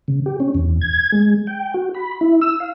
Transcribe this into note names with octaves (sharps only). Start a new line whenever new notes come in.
C#3
G4
C#4
E2
G#6
G#3
G5
F#4
B5
E4
E6
F5